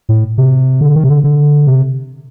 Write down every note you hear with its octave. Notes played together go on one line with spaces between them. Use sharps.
A2
C3
D3
D#3
C3
D3
D3
C3